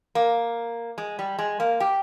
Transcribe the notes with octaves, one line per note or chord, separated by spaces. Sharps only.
A#3
G#3
G3
G#3
A#3
G4